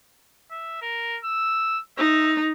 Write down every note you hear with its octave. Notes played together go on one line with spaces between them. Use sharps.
E5
A#4
E6
D#4 E5